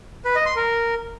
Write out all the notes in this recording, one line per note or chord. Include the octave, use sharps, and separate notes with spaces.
B4
D#5
C6
A#4